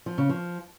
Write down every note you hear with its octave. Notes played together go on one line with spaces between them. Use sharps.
F3
C#3
F3